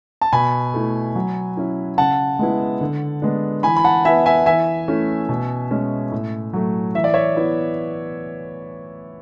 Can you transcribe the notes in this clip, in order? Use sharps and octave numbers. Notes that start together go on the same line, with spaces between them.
A5
B2 G#5 B5
A3 E4
F#3
C#4 E4
C#3 F#5 A5
G#3 B3 E4
D3
G#3 B3 D4
E3 G#5 B5
B5
F#5 A5
B3 E4 E5 G#5
E5 G#5
E3 E5 G#5
A3 C#4 E4
B2
G#3 C#4
A2
F#3 A3
E3 E5
D5
C#5 E5
B3 E4